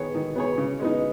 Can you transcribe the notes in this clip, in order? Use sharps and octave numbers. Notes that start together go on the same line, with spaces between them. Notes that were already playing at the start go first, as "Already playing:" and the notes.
Already playing: D#3 B3 G#4 C#5
D#3
B3 G#4 C#5
C#3
G#3 B3 D#4